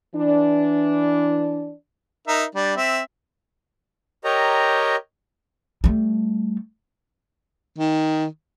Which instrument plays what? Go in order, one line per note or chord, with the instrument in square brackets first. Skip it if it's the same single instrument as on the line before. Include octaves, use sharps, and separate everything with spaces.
[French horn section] E3 D4
[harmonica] D#4 A#4 E5
G3 D4
C4 E5
[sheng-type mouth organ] G4 A#4 C#5 D#5 G5 A#5
[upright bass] G3 A3
[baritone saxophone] D#3